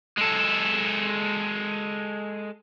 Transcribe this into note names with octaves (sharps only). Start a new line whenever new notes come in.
G#3 A4